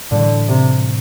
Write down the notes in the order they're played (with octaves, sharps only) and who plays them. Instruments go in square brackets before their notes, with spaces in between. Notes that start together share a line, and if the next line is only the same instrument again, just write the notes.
[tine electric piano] A2 E3 G3 [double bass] D3
[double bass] C3